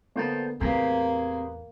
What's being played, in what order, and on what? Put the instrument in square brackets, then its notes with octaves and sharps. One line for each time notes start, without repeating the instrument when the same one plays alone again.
[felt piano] D3 A#3 B3 [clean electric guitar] C5 G5 A5
[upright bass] E2 A2 [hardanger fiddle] A#3 [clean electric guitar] C4 G4 G#4 [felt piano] A#4 B4